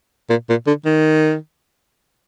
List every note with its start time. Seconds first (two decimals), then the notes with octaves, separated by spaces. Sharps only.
0.30 A#2
0.49 A#2
0.67 D3
0.85 D#3